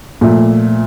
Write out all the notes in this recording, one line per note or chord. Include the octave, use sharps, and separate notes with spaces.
A#2 F3 A3